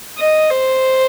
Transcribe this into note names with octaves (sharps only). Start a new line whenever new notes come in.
D#5
C5